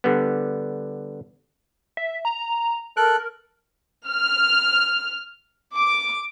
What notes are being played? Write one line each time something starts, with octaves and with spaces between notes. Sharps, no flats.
D3 G3 B3
E5
A#5
A4 A#4 F#6
F6
D6